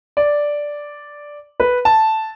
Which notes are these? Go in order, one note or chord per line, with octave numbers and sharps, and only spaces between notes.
D5
B4
A5